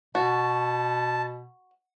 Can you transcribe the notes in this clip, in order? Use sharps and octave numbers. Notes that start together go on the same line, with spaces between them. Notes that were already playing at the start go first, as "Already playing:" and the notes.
B2 F#4 A5